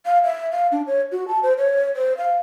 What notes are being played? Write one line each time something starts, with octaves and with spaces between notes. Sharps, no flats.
F5
E5
F5
D4
C#5
F#4
A5
C5
C#5
C5
F5